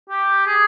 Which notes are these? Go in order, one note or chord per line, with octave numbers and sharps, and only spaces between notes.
G4
G#4